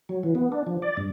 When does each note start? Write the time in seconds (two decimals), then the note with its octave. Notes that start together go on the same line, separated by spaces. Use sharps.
0.09 F#3
0.23 E3
0.35 B3
0.52 D4
0.67 F3
0.82 D5
0.97 G2